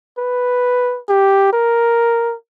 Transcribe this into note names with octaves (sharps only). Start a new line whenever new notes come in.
B4
G4
A#4